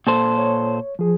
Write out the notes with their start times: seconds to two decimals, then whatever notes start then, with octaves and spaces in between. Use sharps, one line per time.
0.07 A#2 A4 C5
0.38 C#5
0.99 F3 G#4